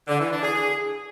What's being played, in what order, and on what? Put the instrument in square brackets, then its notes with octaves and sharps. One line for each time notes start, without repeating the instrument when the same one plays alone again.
[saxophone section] D3
E3
D4
G#4
G#4